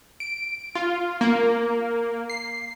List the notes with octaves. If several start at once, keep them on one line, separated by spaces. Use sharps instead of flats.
D7
F4
A#3
C7